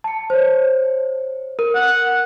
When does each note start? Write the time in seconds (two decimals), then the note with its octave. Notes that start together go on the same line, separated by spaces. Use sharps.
0.04 A5 C#7
0.30 C5 C#5
1.59 A#4
1.75 F#5